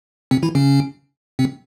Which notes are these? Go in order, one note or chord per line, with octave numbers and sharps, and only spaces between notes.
C3 C4
E3 E4
C#3 C#4
C3 C4